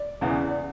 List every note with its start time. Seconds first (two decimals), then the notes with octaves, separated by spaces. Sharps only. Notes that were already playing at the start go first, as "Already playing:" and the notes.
Already playing: D5
0.21 E2 C#3 E3 B3
0.49 D5